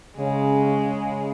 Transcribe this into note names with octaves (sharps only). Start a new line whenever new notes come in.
C#3 G#3
C#3